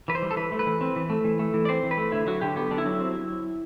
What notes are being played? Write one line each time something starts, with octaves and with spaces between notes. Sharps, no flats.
E3 B4
C5
G3
A4
E3 B4
A3
B4
E3
C4
E3
A3
E3
A3
E3
D5
C4 C5
E3
B4
A3
D3 E4
F#3 F#4
D3 G4
B3 G4
D3 D4
E4
F#3
C4